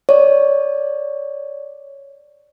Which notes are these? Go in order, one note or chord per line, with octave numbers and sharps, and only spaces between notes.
C#5 D5